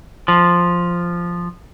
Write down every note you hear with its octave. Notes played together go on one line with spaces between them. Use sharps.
F3